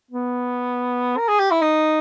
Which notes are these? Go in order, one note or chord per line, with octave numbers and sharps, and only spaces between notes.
B3
A#4
G#4
G4
E4
D#4